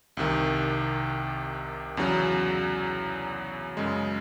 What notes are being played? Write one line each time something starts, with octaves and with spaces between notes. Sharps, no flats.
C2 C3 D#3
E2 C#3 F#3
F#2 C#3 G#3